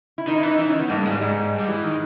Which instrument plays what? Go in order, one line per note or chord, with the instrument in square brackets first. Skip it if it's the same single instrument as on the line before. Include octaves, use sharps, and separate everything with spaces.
[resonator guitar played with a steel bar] E4
[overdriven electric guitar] D#3 [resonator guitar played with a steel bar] D#4
[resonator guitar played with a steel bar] E4
[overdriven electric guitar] E3 [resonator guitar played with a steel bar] D#4
[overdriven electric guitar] E3 [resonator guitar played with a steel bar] D#4
[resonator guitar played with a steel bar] C#4
[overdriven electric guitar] D#3
[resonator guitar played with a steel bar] B3
[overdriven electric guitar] G2 [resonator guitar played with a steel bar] A#3
[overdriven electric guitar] G#2 [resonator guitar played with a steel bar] G#3
[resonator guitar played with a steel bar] G3
[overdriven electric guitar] G#2 [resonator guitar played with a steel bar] G#3
[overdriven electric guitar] G2
G3
E3
D#3